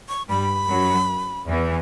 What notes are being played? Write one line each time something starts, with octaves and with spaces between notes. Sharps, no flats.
C#6
G2 G3 B5
F#2 F#3
E2 E3